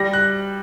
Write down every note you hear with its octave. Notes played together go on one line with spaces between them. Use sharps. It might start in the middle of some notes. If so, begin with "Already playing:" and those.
Already playing: G3 A#6
F#6